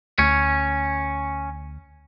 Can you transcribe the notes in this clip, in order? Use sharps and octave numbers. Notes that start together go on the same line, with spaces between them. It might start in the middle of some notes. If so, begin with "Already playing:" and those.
D2 C#4